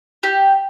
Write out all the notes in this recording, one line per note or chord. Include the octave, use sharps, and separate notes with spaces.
G4